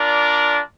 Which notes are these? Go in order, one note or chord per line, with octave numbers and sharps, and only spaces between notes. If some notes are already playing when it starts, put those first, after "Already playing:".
Already playing: D4 F4 A#4 D5